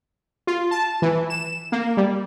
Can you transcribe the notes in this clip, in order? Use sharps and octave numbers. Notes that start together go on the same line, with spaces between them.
F4
A5
E3
E7
A#3
G3